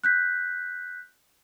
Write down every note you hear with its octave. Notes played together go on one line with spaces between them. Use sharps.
F#6 G6 B6